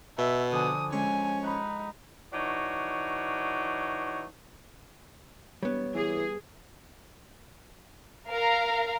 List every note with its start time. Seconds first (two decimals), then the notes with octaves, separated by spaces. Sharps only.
0.18 B2 E5
0.52 D3 F3 G#5 D#6
0.92 G#3 C#4 A4 G#5
1.44 D#4 F#5 B5
2.33 E3 D4 D#4 F#4 C#5
5.63 E1 G3 B3 C#5
5.95 E3 G#4
8.31 A#4 F5 A#5